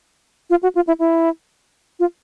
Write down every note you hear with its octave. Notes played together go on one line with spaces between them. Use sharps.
F4
F#4
F4
E4
E4
F4